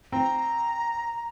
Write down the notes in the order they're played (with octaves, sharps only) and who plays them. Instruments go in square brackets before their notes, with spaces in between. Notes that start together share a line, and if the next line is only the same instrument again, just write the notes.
[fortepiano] C4 [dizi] A#5